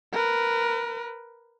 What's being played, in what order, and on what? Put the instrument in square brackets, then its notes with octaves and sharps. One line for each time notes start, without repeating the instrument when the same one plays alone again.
[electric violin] A#4 B4